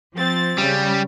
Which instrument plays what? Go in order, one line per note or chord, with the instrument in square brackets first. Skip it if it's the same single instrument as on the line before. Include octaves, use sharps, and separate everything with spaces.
[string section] F3 C4 A6
[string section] C#3 [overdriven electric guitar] G3